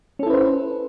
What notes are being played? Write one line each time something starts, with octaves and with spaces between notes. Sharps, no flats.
C#4 E4 A4 B4 C5